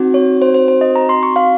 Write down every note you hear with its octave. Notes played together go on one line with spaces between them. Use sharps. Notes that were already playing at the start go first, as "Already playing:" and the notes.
Already playing: C4 D#4 F#4
C#5
C5
C5
C5
D#5
A#5
C6
C#6
F5